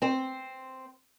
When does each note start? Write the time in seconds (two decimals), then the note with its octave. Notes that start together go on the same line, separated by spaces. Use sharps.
0.02 C4 C5